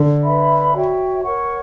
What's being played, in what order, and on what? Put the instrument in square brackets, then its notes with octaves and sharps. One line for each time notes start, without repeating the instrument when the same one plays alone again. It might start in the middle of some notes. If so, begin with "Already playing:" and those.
Already playing: [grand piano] D3
[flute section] B4 E5 B5
F#4 C#5 E5 G5
A#4 C#5 F#5 C#6